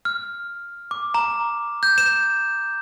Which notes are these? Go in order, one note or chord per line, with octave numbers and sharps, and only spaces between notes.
F6
D6
A#5
G6
E7